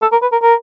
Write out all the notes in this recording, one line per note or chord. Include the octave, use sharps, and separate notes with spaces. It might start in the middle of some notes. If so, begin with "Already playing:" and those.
A4
A#4
B4
A#4
A#4